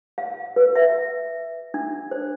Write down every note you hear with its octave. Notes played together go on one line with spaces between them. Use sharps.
F5
B4
E5
D4
C5